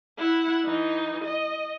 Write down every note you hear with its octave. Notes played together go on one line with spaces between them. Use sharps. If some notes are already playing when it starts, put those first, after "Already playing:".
E4 F#5
E3 D#4
D#5